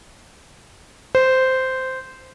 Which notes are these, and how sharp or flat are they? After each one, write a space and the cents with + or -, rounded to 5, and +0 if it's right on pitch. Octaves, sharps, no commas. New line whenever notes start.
C5 -10